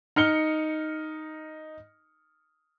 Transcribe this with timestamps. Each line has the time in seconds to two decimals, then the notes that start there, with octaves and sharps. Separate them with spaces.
0.16 D#4 F6 C#7 G7